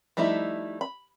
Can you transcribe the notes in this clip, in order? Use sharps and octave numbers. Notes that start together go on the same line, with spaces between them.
F3 G3 A3 D#4 E4
B5